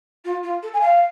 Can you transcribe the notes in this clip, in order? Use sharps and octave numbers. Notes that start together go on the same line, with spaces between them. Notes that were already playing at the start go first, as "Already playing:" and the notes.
F4
F4
A4
G#5
F5